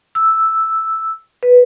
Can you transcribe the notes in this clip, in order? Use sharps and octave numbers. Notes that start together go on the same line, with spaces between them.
E6
B4